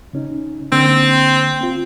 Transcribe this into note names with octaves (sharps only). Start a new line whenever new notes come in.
C#3 C#4 D#4
D3 A#3 C4
C4 F4